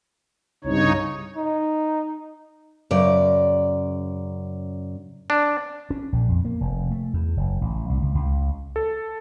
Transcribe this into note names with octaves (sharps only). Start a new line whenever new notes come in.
C2 G2 C#3 D#4 C#5
D#4
F#2 C#3 D5
D4
C#4
A#1
F2
A#3
F1
A3
E2
F#1
A1
C2
C#2
C#2
A4